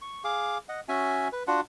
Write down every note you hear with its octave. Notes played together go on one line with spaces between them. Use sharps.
C#6
G#4 F5 D6
D#5 F#5
C#4 F#4 E5 G#5
B4
D4 F4 F#4 F#5